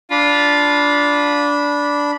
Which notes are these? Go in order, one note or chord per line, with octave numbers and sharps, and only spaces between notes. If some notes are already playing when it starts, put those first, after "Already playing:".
D4 F4 B5